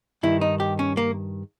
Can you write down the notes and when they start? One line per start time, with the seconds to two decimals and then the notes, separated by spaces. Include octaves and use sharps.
0.23 G2 D#3 E4
0.41 D#4
0.60 G4
0.79 C#4
0.97 A#3